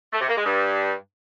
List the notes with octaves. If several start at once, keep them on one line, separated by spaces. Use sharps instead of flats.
A3
C3
A#3
G#3
G2